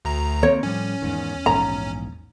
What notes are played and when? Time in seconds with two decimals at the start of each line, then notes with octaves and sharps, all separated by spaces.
0.05 D2 A#5
0.43 D#3 A#3 C4 C#5
0.63 A2 F3 G3 C#4
1.02 E2 G#2 D#3
1.46 A#1 E2 G#2 A#5